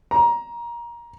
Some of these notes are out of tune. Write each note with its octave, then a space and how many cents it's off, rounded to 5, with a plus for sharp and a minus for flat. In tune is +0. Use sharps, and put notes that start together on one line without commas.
A#5 +20